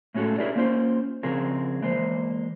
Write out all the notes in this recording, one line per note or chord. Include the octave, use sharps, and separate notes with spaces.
A2 G#3 C#4 F#4 A4
D4 E4 G4 G#4 A#4 D5
A#3 C#4 F4 C5
C#2 C#3 F3 C4 G#4 A#4
E3 G#3 A#3 C5